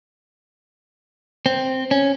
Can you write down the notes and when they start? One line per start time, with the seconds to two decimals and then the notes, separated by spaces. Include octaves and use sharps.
1.46 C4
1.91 C#4